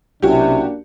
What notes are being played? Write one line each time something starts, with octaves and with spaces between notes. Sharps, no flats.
B1 C3 A#3 C#4 D4 E4 F#4 G4